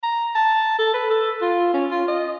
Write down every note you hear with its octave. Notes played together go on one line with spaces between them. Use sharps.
A#5
A5
A4
B4
A4
F4
C#4
F4
D#5